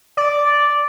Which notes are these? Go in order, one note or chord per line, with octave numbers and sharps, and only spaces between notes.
D5